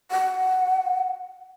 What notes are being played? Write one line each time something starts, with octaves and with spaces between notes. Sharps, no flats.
F#5